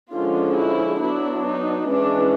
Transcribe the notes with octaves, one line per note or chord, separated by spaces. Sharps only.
D3 F3 G#3 C#4 F4
E4
F#3 B3 D4 E4
D#4
E3 G#3 C#4 D4